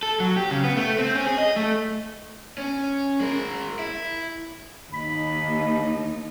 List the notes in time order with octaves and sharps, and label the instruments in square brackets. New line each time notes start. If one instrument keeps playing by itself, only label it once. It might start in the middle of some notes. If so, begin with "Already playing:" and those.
[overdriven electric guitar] A4
F#3
G4
C#3
B3
A3
C4
C#4
G#4
D#5
A3
C#4
G#3 A#4
E4
[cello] D#2 D#4 [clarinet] B5